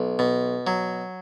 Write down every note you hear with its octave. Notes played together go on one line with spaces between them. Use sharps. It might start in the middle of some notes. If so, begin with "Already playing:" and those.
Already playing: B1
B2
F#3